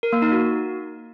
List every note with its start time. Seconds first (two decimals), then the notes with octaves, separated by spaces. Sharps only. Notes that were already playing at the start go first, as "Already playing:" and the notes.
0.03 A#4
0.13 A#3
0.22 D#4
0.32 F#4